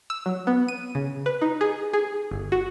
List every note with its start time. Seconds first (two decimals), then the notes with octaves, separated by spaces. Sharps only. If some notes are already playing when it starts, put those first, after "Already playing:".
0.10 E6
0.26 F#3
0.47 B3
0.68 D#7
0.95 C#3
1.26 B4
1.42 D#4
1.61 G#4
1.93 G#4
2.31 G1
2.52 F#4